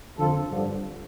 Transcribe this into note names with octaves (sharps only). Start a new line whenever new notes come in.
F2 D3 F3 F4 A4
G2 D3 F3